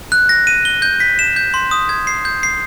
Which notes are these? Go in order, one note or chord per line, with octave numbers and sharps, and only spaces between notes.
F#6
A#6
D#7
G7
G6
B6
E7
G6
C6
D#6
G#6
C7
G6
C7